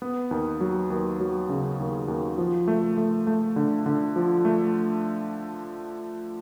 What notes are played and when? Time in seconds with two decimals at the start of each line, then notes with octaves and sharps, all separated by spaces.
0.02 B3
0.31 D#2
0.60 F#3
0.90 D#2
1.20 F#3
1.49 C#3
1.79 D#2
2.08 D#2
2.38 F3
2.68 A3
2.97 A3
3.27 A3
3.56 D3
3.86 D3
4.16 F3
4.45 A3